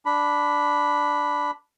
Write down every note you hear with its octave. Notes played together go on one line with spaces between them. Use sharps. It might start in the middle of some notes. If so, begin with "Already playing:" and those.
D4 B5